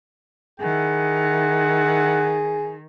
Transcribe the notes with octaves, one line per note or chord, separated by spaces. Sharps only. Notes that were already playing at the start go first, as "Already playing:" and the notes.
D#3 E4 G#4 F#5